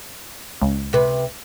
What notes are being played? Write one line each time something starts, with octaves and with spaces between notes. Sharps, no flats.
C#2
C3 B4